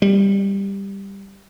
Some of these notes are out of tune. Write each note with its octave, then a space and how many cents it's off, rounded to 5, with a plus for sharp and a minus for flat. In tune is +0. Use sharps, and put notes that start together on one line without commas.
G3 +10